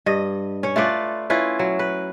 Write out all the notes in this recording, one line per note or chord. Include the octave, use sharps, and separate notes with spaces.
G2 D#5
C#4 C#5
A3 F4 B4 D5
C#4 E4 F4 B4
F#3
B4